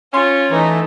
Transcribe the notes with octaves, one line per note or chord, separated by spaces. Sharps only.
C#4 F4 C6
E3 A3 D#4